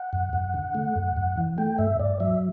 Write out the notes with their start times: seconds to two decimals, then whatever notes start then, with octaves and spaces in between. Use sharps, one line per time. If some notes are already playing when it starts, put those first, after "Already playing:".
Already playing: F#5
0.13 F#2
0.33 F#2
0.54 D3
0.75 A3
0.96 F#2
1.17 F#2
1.37 E3
1.58 A3 G5
1.78 G2 E5
1.99 G2 D5
2.20 F#3 E5